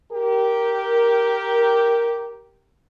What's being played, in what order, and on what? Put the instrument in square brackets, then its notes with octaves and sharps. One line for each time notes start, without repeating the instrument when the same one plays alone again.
[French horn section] G4 A#4